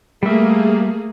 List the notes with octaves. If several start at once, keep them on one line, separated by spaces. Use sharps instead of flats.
G3 A3 A#3 G#4 E5